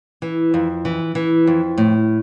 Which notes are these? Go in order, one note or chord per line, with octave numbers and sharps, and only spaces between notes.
E3
F2
E3
E3
F2
A2